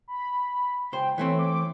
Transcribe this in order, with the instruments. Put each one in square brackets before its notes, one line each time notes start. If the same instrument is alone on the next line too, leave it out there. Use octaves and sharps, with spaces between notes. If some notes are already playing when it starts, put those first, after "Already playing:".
[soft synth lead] B5
[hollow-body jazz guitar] C#2 C5 [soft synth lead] G5
[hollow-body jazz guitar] E3 A3 C4 [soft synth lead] C#5
[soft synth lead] D6